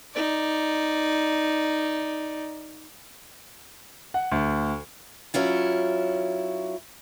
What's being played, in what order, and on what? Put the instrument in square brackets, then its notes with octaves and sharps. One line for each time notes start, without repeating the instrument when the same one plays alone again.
[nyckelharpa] D#4 D5
[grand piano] F#5
D2
[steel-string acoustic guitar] F#3 C#4 E4 F4